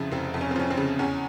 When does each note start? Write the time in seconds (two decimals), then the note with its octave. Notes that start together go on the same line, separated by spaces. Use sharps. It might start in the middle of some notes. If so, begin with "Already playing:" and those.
Already playing: F1 F2 C#3 F3 E4
0.12 F1 C4
0.34 F2
0.41 C#4
0.51 C4
0.56 F3 C#4
0.70 C4
0.77 C#3
0.99 E2 C#4